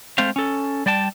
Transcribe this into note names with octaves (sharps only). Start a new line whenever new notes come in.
G#3 A3 C4 C5 F5
C#4 A4
G3 D5 G5 A5